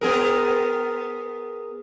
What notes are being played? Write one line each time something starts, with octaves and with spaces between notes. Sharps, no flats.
B3 G#4 A#4